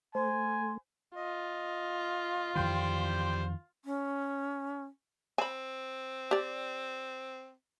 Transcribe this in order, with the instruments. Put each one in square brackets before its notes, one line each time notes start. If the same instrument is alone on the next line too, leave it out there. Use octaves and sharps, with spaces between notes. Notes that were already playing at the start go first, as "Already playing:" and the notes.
[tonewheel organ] A3 [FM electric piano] C5 [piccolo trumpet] G#5 [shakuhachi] C6
[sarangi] F4 [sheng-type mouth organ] D#5
[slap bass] F2 D#3 E3 [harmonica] G3 C5 [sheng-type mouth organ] G5 G6
[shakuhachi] C#4
[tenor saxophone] C4 [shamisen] G#5 B5
[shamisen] G4 D5